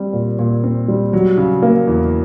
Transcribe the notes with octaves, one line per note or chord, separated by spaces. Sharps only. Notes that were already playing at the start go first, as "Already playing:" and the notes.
Already playing: G3 C4
A#2
A#2
C4
G3
F#3
C#3
A#3
E2